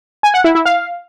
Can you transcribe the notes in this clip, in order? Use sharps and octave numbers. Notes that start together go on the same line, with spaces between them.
G#5
F#5
E4
E4
F5